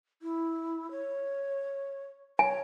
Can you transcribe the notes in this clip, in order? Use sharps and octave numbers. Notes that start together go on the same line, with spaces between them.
E4
C#5
C#5 G#5